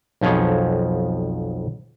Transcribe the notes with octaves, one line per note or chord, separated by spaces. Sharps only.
B1 F2 F3 G#4 C#5